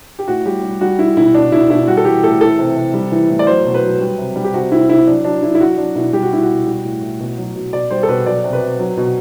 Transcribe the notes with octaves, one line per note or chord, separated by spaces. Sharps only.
G4
A2 F#4
G3 G4
G3
G3 F#4
G3 E4
B2 E4
B2 D4
B2 E4
B2 E4
G3 F#4
A4
E3 G4
A2 A4
E3 A4
C3
C3
G3
E3
A2
D5
F#3 C5
B2
B4
F#3
G3
C3
G3
G4
C3 F#4
C3 E4
C3 E4
F#3 D4
F#3 D4
F#3 E4
E4
F#3 F#4
F#3 D4
B2 E4
G3 G4
F#4
G3 E4
F#4
B2
G3
A2
A2
B2
F#3
B2
B2 D5
G3 C5
A4
B2 B4
F#3 D5
C3
B4
C3
F#3
B2